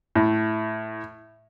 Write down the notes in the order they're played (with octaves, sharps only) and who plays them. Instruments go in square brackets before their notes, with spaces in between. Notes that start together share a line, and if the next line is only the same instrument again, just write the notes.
[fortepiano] A2